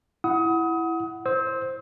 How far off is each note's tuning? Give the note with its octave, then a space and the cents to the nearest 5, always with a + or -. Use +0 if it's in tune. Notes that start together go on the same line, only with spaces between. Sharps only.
E4 +5 F#5 +0 D#6 +30
C5 +10 E6 -30